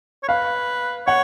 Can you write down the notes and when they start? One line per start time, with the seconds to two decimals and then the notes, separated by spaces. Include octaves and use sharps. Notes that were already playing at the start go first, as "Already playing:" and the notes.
0.23 C#5
0.28 B4 F5
1.07 C#5 F#5